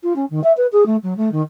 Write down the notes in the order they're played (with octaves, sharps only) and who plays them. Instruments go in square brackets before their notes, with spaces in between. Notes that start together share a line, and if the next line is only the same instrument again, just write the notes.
[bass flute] F4
C#4
D#3
E5
B4
G#4
A3
F#3
A3
D#3